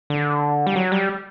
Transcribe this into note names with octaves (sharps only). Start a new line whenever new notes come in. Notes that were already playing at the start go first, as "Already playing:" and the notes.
D3
G3
F#3
G3